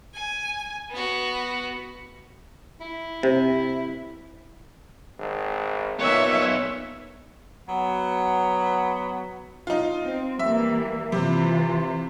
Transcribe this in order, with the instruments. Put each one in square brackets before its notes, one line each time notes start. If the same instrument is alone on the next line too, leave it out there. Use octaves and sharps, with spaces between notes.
[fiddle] G#5
B3 F#4
[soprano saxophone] E4
[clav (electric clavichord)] C3
[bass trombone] G#1
[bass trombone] A#2 [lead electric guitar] B3 D#4 [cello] C#5 E5
[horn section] F#3 B3
[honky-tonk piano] D#4 F4
[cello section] C4
[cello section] E3 G3 A#3 [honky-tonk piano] E5
[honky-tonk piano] C3 [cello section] E3 F4